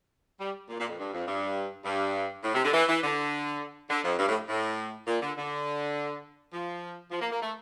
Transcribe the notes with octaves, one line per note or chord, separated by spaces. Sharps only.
G3
A#2
A#2
F2
G2
F2
G2
G2
A2
C3
D3
E3
E3
D3
D3
F2
G2
A2
A2
A#2
D3
D3
F3
F3
A#3
A#3
A3